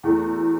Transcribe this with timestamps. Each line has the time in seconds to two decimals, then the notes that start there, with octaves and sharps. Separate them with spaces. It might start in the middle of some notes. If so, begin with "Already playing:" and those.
0.03 E2 E3 A3 E4
0.26 F#4